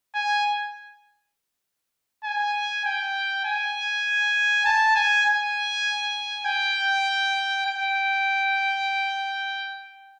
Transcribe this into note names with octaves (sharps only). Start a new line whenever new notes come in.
G#5
G#5
G5
G#5
A5
G#5
G#5
G5
G5